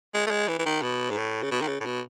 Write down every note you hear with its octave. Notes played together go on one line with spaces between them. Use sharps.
G#3
A3
G#3
E3
E3
D#3
B2
G#2
A2
C#3
B2
D#3
C#3
A2
B2